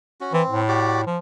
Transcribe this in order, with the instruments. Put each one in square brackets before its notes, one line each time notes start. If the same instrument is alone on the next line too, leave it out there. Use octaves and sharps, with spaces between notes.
[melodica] C#4 F#4
[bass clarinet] E3 [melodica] C4
[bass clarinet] A2
[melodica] F#4 G4 D5
[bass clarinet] F3